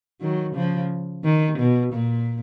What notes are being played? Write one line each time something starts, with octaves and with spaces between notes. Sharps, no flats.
D#3 F#3
C#3 F3
D#3
B2
A#2